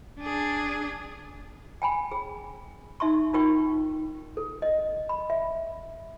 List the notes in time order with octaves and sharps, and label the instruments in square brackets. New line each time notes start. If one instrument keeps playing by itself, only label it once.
[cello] D4 G#4
[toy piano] G5 G#5 B5
G#4
D#4 E5 C6 C#6
D#4 F4 A#4 G5 C#6
A4
D#5
B5
E5